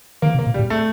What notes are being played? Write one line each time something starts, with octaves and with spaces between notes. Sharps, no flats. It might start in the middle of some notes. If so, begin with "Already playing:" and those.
D#3 A#3
C3
A#3
A#2
G3
A2
A3